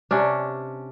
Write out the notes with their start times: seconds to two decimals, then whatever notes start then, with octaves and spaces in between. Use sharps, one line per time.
0.11 C3 C#4 D4